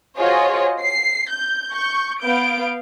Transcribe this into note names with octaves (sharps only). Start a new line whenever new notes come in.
F4 F#4 G#4 C5 C#5 D#5
C7
G6
C#6 G6
B3 F5 G6 D7